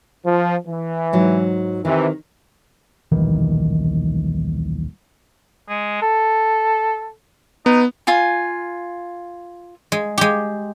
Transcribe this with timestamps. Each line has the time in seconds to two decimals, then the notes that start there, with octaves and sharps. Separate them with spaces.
0.25 F3
0.67 E3
1.13 G#2 F#3
1.85 C3 D#3 E3
3.12 D#1 B1 D#3 E3
5.69 G#3
6.02 A4
7.66 B3 D#4
8.07 F4 G#5
9.92 G#3
10.18 G#3 G4